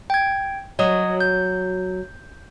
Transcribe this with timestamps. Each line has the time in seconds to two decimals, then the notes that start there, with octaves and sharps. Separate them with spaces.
0.10 G5 G#6
0.79 F#3 C#5 D#5 D#6
1.20 G6